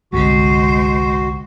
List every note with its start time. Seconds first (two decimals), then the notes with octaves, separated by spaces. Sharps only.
0.12 G1 C2 D3 G#3 F#4 C5